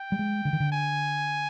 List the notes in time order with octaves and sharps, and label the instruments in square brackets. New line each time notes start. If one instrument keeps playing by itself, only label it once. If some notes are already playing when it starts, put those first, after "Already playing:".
Already playing: [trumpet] G5
[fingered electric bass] G3
G#3
D3
D#3
D3
[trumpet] G#5